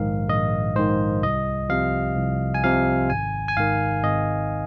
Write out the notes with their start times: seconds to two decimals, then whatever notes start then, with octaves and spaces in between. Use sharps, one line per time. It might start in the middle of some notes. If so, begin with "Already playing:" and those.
Already playing: A#1 G#2 D#3 F5
0.29 A#1 D#5
0.76 G#2 D#3 C5
1.23 C2 D#5
1.69 C3 F3 F5
2.17 C2
2.54 G#5
2.63 C3 F3 F5
3.10 G#1 G#5
3.48 G#5
3.57 G#2 D#3 F5
4.04 G#1 D#5